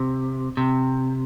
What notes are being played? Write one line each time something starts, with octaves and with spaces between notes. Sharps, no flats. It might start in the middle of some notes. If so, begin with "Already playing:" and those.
Already playing: C3
C3